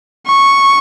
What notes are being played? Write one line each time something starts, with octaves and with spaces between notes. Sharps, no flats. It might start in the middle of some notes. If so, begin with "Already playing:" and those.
C#6